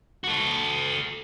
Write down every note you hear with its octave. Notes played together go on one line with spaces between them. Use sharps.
F#4 A4